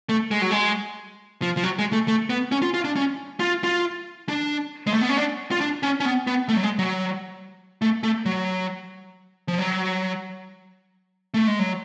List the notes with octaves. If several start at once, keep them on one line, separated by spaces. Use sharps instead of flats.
A3
G#3
F#3
G#3
F3
F3
F#3
G#3
A3
A3
B3
C#4
F4
F4
D4
C#4
F4
F4
D4
G#3
A3
B3
C#4
D4
F4
D4
C#4
C#4
B3
B3
A3
F#3
G#3
F#3
A3
A3
F#3
F3
F#3
A3
G#3
F#3